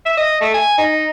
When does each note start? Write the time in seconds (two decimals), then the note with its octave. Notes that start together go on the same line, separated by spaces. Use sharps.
0.06 E5
0.17 D#5
0.41 A3
0.54 G#5
0.78 D#4